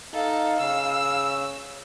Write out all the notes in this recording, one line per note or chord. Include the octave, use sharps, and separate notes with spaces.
D#4 A4 F5
C#3 E6